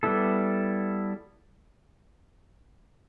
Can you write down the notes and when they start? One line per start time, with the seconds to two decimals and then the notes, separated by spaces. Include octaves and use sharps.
0.03 G3 B3 E4 A4